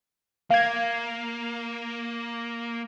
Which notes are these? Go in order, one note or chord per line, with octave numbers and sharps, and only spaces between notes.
A#3 F5 G#6